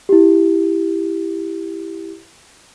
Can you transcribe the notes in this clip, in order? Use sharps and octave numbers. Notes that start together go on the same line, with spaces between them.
E4 G4